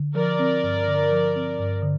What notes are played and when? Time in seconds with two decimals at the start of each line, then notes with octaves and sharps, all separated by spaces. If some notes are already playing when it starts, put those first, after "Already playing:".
Already playing: D3
0.15 F3 A#4 D5
0.39 C4
0.63 G2
0.87 D3
1.11 F3
1.36 C4
1.59 G2
1.82 D3